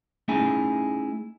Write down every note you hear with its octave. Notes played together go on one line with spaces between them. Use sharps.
A3 C#4 D#4 E4 G#4 G#5